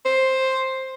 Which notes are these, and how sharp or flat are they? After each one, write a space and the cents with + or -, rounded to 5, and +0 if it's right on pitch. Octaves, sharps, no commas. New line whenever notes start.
C5 +5